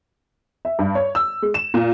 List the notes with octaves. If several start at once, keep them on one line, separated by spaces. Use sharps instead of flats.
E5
G2
C#5
E6
G#3
E7
A#2